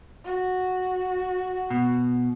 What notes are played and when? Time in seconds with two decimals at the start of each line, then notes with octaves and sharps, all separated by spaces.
0.25 F#4
1.70 B2